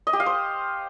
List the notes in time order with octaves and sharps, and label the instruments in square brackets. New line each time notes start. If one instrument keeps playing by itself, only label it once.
[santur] D#5
G4
F5
C5